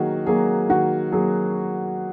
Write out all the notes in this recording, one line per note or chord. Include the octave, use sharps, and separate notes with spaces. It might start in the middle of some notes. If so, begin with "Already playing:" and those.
Already playing: D#3 F#3 A#3 F#4 G#4
F#3 A#3 G#4
D#3 F#4
F#3 A#3 G#4